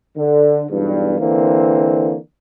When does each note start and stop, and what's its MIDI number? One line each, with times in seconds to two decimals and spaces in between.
0.17 0.64 50
0.70 1.19 35
0.70 1.19 40
0.70 1.19 43
1.20 2.16 50
1.20 2.16 52
1.20 2.16 58
1.20 2.16 60